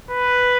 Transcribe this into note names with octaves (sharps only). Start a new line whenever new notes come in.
B4